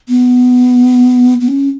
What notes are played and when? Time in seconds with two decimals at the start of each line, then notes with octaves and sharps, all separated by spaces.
0.09 B3
1.41 B3
1.48 C#4